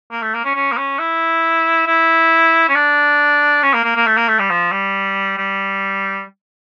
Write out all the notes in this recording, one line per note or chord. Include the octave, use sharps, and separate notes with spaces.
A#3
A3
A#3
C#4
C#4
A#3
C#4
E4
E4
C#4
D4
C#4
A#3
A#3
A#3
A3
A#3
A3
G3
F3
G3
G3